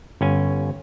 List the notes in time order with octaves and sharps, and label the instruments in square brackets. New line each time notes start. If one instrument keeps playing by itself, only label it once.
[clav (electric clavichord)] G1 C#4 G#5